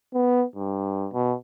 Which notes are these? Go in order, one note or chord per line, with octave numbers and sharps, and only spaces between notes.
B3
G2
B2